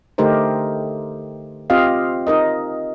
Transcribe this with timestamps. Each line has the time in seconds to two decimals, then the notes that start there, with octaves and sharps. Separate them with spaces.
0.18 D3 A3 D#4 G4 A#4 C5
1.70 C4 F4 G4 D#5 F5
2.27 D#4 A#4 D#5